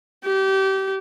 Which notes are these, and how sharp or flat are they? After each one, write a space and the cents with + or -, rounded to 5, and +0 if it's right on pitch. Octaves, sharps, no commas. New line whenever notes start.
G4 -25